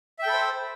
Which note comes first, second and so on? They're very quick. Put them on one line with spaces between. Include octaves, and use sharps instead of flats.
E5 G5 A4 B5 C5